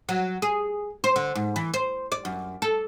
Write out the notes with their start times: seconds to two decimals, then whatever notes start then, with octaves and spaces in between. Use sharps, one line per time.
0.09 F#3
0.42 G#4
1.04 C5
1.16 D3
1.35 G#2
1.56 E3
1.74 C5
2.12 D5
2.25 F#2
2.62 A4